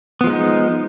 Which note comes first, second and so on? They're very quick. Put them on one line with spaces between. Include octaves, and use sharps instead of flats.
B3 F3 G#3 D#4